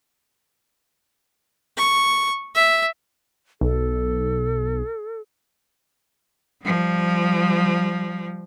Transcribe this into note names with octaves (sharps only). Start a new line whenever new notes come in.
C#6
E5
B1 A4
F3 G3